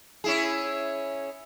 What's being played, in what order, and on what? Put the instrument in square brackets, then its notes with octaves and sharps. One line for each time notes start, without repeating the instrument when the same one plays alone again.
[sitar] C#4 E4 G#4